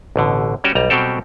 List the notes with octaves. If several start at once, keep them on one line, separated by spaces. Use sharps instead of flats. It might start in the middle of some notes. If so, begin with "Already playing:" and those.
A1 B2 D3
G3 C#4 F#4 G4
B1 G3 A#5
B2 F#3 G3 C4 G4 A4